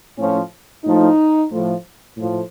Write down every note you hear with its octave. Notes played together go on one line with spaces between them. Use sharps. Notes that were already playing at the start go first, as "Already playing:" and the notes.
A2 F3 C#4
A2 F3 D#4
A2 F3
A2 F3